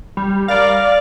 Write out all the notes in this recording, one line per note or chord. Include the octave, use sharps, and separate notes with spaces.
G3
A#4 D5 F5
D5